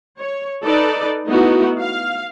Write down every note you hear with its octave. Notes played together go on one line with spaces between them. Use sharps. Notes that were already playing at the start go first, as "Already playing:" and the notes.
C#5
D#4 A4 B4 D5
A3 B3 D#4 E4 F#4
F5